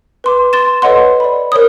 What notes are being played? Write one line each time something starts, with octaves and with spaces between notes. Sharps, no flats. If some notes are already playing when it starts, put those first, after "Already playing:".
B4 C6 D6
C6 A6 E7
A4 B4 C#5 D#5 F#5 C6
D5 B5
A#4 C5 C#5 D#6